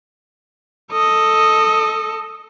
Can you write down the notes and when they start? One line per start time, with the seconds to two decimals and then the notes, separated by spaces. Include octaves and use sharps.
0.92 A4 D#5